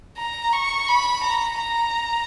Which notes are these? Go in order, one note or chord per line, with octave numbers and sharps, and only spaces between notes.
A#5
C#6
B5
A#5
A#5